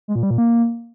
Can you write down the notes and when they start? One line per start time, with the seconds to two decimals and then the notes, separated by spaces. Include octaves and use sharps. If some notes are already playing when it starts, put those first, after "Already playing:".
0.08 G#3
0.15 A#2
0.23 G3
0.31 A#2
0.38 A#3